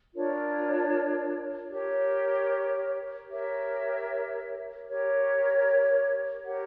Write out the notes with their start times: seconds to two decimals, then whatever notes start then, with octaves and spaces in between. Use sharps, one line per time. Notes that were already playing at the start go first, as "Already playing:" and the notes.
0.13 D4 F4 A#4 C#5
1.70 G4 A#4 C#5
3.28 G4 A#4 C#5 E5
4.86 G4 A#4 C#5
6.44 G4 A#4 C#5 F#5